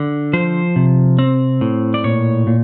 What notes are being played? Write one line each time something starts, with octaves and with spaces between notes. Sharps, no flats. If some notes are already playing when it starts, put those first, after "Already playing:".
Already playing: D3
F3 C5
C3
C4
A2
D5
A#2 C#5
A#2